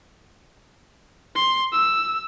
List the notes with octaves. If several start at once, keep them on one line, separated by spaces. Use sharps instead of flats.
C6
E6